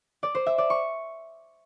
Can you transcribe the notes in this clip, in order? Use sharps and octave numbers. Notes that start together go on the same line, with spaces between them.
D5
C5
E5
D5
C#6